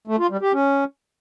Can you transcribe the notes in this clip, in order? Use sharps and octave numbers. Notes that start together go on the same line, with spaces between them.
A3
F4
G3
G4
C#4